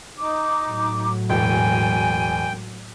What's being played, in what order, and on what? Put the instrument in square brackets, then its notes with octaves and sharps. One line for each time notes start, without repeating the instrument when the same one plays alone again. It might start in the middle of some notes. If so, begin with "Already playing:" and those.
[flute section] D#4 D6
[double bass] A2 F#3
[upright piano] E1 [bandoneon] G5 [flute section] G#5